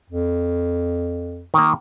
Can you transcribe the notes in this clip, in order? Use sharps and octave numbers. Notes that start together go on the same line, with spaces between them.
F2
D#3 A#3